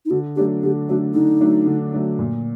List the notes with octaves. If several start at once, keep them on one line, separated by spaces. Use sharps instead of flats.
D#4
D3 F#4
F#3 A3 D4 G4
D3 G4
F#3 A3 D4 F#4
D3 D#4
F#3 A3 D4
D3
F#3 A3 D4
A#2